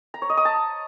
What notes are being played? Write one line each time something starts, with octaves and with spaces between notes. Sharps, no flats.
A#5
C#5
D#5
D#6
A5